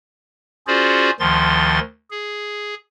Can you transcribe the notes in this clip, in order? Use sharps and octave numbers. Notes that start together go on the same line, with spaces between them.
C#4 F4 F#4 G#4 C5 D5
D2 D#3 F3 C6 A6
G#4